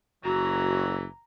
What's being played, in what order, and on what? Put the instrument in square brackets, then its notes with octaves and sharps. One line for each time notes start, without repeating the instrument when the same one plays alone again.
[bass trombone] F#1 [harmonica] E3 F#3 [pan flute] F#4 [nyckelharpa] A#5